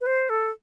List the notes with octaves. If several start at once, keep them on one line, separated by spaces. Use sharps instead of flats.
B4
C5
A4